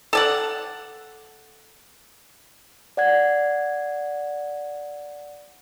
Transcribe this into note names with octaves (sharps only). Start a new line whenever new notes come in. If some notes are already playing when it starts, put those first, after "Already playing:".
A4 D5 F#5
D5 F#5 G#6